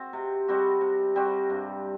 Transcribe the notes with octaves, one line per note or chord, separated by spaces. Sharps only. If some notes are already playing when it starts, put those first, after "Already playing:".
Already playing: C4 F#4
C3
G3 C4 F#4
C3
G3 C4 F#4
G2